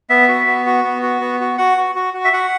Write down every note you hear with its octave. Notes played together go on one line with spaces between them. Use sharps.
B3 E5
F#4
B3
F#4
B3
F#4
B3
F#4
F#4 F#5
F#4
F#4
F#4
E5
F#4 F#5